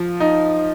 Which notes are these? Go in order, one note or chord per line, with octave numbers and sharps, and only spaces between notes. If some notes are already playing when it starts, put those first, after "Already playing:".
Already playing: F3
D#4